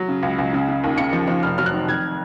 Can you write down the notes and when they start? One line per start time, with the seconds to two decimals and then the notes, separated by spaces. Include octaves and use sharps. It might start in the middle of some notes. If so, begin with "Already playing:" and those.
Already playing: F#3
0.08 C#3
0.23 C#2
0.38 C#2
0.53 C#3
0.69 C#3
0.84 D#2
0.98 C#3 C#7
1.13 F3
1.28 F3
1.43 F1 F6
1.58 F#3 F6
1.66 F#6
1.73 D#3
1.88 F2 G#6